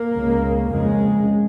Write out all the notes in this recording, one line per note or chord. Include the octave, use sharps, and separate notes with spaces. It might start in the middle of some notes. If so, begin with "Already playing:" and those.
Already playing: A#3
C#2 C#3
F2 C#3 G#3